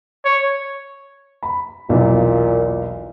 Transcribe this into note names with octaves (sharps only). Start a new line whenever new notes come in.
C#5
B5
B1 E2 A#2